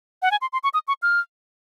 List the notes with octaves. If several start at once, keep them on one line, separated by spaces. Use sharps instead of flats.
F#5
G#5
C6
C6
C#6
D#6
C#6
F6